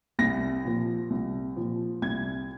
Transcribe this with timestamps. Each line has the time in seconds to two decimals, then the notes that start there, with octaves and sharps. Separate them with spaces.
0.19 C2 A#6
0.65 A#2 F3
1.10 C2
1.56 A#2 F3
2.02 C2 G#6